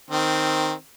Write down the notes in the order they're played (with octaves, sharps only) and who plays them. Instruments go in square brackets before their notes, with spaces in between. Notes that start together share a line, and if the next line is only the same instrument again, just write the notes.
[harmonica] D#3 C4